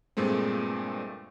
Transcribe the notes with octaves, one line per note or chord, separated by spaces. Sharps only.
G2 A#2 G#3 A3 C4